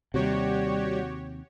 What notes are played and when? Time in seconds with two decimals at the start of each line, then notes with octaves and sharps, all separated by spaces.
0.14 D#2 C3 G3 F#4 G4 C#5